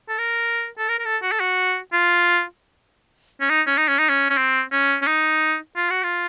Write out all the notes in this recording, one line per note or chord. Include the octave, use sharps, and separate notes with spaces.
A4
A#4
A4
A#4
A#4
A4
F#4
A4
F#4
F4
C#4
D#4
C#4
D#4
C#4
D#4
C#4
C#4
C4
C#4
C#4
D#4
F4
F#4
F4